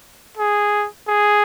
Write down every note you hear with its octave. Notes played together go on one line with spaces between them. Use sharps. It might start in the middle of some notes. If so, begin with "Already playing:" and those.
G#4
G#4